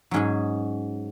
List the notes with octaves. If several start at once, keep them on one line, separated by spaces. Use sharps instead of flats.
G#2 F#3 C#4 G#4